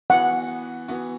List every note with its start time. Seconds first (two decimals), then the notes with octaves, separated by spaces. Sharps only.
0.10 E3 B3 F#4 F#5
0.88 E3 B3 F#4